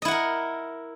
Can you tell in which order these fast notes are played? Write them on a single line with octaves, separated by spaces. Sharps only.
D#5 E4 F#5 A#4